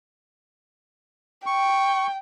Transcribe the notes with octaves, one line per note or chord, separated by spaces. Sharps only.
G5 C#6